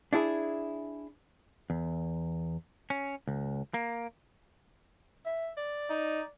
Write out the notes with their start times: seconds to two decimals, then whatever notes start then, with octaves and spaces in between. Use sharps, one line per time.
0.13 D4 E4 G#4
1.70 E2
2.90 C#4
3.27 C#2
3.74 A#3
5.26 E5
5.57 D5
5.90 D#4